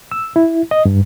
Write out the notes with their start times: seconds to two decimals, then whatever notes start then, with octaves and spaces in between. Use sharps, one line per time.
0.12 E6
0.36 E4
0.71 D#5
0.85 G2